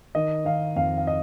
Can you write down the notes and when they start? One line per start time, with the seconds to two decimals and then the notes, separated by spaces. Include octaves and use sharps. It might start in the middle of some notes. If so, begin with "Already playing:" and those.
0.15 D#3 D#5
0.45 D#3 F5
0.76 F2 F5
0.98 F5
1.07 D#5